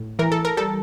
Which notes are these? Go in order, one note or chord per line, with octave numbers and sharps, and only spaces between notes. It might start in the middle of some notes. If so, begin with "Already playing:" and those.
Already playing: A2
E3 A#4
A4
A#4
G3 A4